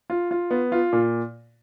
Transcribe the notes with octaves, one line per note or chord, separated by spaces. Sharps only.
F4
F4
B3
F4
A#2